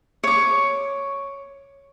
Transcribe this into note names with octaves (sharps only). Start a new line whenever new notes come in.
C#5 D6